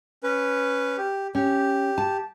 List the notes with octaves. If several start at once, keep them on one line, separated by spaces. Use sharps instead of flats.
C#4 B4
G4
C#4 G4
A5